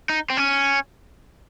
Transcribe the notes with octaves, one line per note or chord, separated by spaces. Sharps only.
D#4
C4
C#4